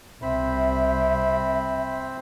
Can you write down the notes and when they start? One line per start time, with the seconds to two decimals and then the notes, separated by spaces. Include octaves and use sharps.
0.22 C2 C4 C5 E5 B5